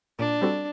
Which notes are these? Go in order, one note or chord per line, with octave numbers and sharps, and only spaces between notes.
A#2 D4
G3 C4 F#4 A4